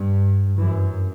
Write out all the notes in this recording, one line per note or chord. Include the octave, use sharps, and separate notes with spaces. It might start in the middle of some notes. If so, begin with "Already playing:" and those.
Already playing: G2
F#2 E3